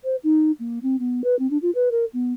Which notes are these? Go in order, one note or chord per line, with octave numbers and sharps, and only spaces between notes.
C5
D#4
A#3
C4
B3
B4
C4
D4
F4
B4
A#4
B3